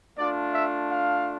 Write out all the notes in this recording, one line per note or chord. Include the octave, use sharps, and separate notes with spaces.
A3 D4 F4 D5
E5
F5